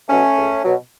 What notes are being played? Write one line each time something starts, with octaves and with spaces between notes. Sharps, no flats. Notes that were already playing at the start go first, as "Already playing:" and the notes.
B2 F#3 A3 C#4
C#2
B2 F#3